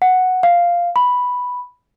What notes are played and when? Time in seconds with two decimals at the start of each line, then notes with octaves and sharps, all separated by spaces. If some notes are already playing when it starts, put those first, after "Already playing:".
0.02 F#5
0.43 F5
0.96 B5